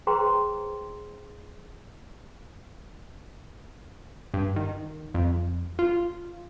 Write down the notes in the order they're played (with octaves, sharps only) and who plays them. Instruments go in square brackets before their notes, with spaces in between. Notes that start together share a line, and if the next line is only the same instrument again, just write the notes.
[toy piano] G#4 B4 C5 G5 A#5 C6
[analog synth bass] G2
D#3
F2
F4